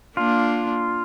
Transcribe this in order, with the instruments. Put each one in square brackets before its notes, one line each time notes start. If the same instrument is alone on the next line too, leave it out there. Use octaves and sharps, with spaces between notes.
[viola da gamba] A#3 D4 [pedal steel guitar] F4